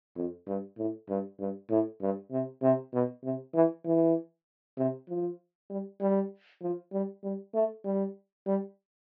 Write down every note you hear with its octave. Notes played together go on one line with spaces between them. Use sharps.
F2
G2
A2
G2
G2
A2
G2
C3
C3
B2
C3
E3
E3
C3
F3
G3
G3
F3
G3
G3
A3
G3
G3